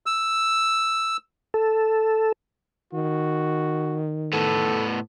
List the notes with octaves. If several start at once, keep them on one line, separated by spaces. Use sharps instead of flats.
E6
A4
D#3 F#4
A2 B3 A4